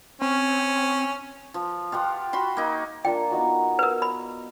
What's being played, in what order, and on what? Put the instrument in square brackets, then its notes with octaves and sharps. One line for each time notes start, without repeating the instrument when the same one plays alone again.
[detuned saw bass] C4 [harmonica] C#4
[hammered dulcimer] F3
F4 G4 F#5 C6
F#4 B5 C6
A#3 D#4
[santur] A#3 D4 F4 [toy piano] G5
[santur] B3 D#4 F#4
[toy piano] A#4 B4
[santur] D#5 [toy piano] B5